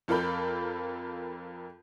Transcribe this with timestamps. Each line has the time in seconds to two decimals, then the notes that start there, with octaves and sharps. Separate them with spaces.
0.08 F2 F4 A4 A#4 B5 G6